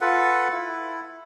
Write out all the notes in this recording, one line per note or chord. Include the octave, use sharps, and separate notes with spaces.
F4 A4 B4 F#5
E4